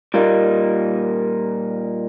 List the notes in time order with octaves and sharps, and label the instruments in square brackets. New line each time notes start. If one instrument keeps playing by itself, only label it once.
[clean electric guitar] A#2 G3 A#3 D#4